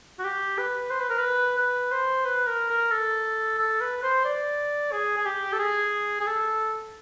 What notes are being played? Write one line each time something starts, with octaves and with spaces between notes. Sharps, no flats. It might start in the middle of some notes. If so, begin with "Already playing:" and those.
F#4
G4
B4
C5
B4
A#4
B4
B4
C5
B4
A#4
A#4
A4
A4
B4
C5
D5
G#4
G#4
G4
A4
G#4
G#4
A4